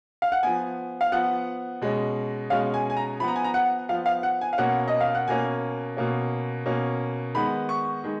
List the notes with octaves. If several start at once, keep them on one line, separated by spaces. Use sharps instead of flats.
F5
F#5
F3 B3 G#5
F5
F3 B3 F#5
B2 G#3 C#4
B2 G#3 C#4 F5
G#5
G#5
A#5
F3 B3 A#5 B5
G#5
A#5
F#5
F3 B3 F5
F5
F#5
G#5
F5
B2 A#3 C#4 F#5
D#5
F5
F#5
B2 A#3 C#4 G#5
B2 A#3 C#4
B2 A#3 C#4
D#3 G#3 B3 B5
C#6
D#3 G#3